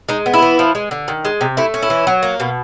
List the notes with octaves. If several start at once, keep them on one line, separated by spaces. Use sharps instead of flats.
G#3 D#4
B3
E4
E3
F3
G#3
D3
D#3
G#3
C3
A3 E4
C#4
E4
E3
F#3
A#3
B2